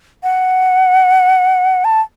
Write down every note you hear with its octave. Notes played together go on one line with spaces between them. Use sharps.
F#5
A5